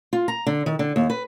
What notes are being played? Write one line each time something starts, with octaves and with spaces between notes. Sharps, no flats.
F4
A#5
D3
D#3
D3
D#2
B4